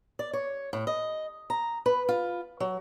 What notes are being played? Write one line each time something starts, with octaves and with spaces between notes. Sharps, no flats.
D5
C#5
A2
D#5
A#5
B4
F4
F#3